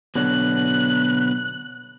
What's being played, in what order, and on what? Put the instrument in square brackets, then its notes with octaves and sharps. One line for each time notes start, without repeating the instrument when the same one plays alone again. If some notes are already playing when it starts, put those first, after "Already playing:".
[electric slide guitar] B2 D3 F#3 [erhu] F#6